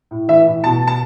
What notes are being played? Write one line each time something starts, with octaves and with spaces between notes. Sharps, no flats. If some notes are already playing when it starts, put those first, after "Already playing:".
A2
E3 E5
A2
B2 A5
A5